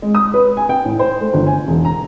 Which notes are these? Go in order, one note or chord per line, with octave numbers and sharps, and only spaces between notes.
G#3
D#6
B4
G#5
G5
A2
C5
A3
G1
G#5
E1
A#5